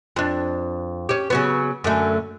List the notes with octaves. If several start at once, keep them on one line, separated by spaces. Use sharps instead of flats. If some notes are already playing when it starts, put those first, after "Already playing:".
F2 D4
C#4 G4
C#3 F#3 B3
F#2 D3 A3